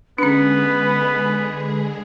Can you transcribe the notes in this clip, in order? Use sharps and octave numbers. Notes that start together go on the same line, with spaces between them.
D3 G#3 B3 C#4 D4 G#4 B4